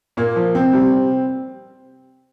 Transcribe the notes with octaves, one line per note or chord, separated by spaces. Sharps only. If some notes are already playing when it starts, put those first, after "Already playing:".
A#2 A#3
F3
C3 C4
G3
C3